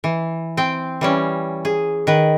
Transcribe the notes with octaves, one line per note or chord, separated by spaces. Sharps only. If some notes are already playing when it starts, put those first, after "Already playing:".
E3
C4 G5
E3 G3 C#4
G#4
D#3 B4